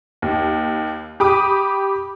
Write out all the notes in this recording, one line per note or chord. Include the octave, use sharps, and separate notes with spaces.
D#2
G4 B5 D6 D#6